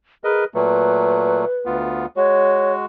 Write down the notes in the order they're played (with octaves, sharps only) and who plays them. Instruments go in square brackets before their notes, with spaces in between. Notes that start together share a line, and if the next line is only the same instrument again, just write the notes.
[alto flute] G#4 [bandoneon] A#4 B4 D#5
[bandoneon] A#2 F#3 A3 [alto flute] B4
[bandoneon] D2 B3 F4
[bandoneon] G#3 F#4 [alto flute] C#5